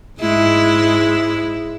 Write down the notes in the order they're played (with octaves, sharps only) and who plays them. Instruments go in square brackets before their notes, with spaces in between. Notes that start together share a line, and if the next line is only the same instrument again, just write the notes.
[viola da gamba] G#2 G#3 E4